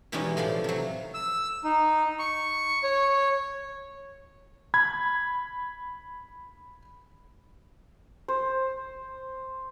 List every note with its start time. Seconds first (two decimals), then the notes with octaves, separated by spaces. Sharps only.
0.12 B2 E3 G3 G#3 C#4 D#4
0.37 A2 F3 D5 B5
0.64 C3 F#3
1.14 E6
1.64 D#4
2.19 C#6
2.84 C#5
4.74 B5 G#6
8.28 C5